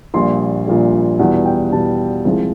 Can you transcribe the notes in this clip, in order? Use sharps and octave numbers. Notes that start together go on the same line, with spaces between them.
A#1 A#2 G3 C6
A#1 A#2 G3
E2 B2 G3 F#5
G5
E2 B2 G3 A5
C2 C3 F3 G#3